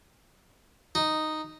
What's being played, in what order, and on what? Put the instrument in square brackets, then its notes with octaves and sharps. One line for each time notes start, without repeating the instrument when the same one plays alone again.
[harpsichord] D#4